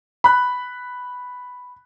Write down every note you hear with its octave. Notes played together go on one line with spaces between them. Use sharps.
B5 F#6